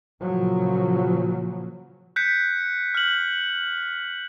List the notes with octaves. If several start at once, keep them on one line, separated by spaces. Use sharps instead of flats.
A#2 C#3 F3 F#3
F#6 G6 B6 C#7
F6 F#7